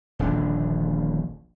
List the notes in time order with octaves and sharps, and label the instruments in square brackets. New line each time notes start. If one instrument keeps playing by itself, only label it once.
[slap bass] D#1 A#1 D3 D4